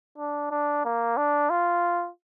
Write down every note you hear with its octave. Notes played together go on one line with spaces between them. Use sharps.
D4
D4
A#3
D4
F4